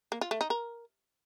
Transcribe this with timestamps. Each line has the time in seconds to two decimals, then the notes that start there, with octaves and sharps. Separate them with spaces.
0.12 A#3
0.21 F4
0.31 A3
0.41 D#4
0.50 A#4